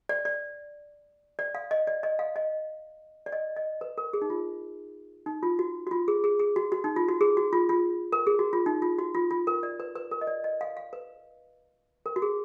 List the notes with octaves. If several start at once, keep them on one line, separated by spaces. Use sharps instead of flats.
D5
D5
D5
F5
D#5
D5
D#5
F5
D#5
D5
D#5
D#5
B4
A#4
G#4
D#4
F4
D#4
F4
F#4
F#4
F4
G#4
G#4
G#4
F#4
F#4
D#4
F4
F#4
G#4
F#4
F4
F4
A#4
G#4
F#4
F4
D#4
F4
F#4
F4
F4
A#4
D5
B4
B4
A#4
D#5
D5
D#5
F5
F5
B4
A#4
F#4
G#4